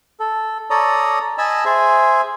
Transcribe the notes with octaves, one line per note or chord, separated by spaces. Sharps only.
A4
A4 C#5 D5 A#5 D#6
D#5 G#5 A5 B5 E6
G#4 C5 E5 G#5